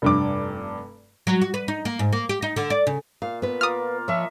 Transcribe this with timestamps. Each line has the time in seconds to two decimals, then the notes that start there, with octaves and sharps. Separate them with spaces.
0.02 F1 G2 D6
1.27 F#3
1.42 F#4
1.54 B4
1.68 D#4
1.85 A#3
1.99 G#2
2.13 A#3
2.29 G4
2.42 D#4
2.56 D3
2.70 D5
2.87 C#3
3.22 A#2 F5
3.42 B3 B4
3.61 F4 A#4 D6 D#6 F6
4.08 F3 C#5 D#5 E5